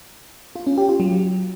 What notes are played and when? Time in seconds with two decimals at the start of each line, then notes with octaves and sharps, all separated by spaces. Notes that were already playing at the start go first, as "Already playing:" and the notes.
0.56 F4
0.67 C#4
0.78 G4
0.89 F4
1.00 F#3